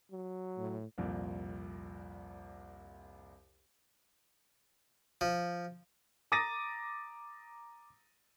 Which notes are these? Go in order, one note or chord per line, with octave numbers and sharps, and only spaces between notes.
F#3
A2
C2 F2 A#2
F3
A#5 D6 D#6 A6 A#6 D#7